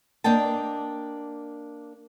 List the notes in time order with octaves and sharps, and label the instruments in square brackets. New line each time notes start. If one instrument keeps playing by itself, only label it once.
[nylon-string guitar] A#3 D4 D#5 G5 A5